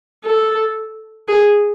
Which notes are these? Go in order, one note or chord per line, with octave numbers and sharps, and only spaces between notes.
A4
G#4